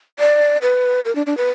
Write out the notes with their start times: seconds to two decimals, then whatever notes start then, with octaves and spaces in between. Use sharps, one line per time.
0.19 D5
0.62 B4
1.05 A#4
1.15 D4
1.26 D4
1.37 B4